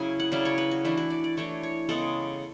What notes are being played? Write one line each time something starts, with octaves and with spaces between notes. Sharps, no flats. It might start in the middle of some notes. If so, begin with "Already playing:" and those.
Already playing: C#3 F#3 C#4 E4 G#5
F#5
C#3 F#3 C#4 E4 D5
C#5
B4
F#4
E3 A3 D4 E4
F#4
D5
D5
E3 A3 D4 C#5
C#5
C#3 G#3 B3 A4